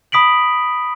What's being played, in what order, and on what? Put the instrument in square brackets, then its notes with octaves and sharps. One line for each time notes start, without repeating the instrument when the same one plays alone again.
[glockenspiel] B5 D#6 B6 D7 F#7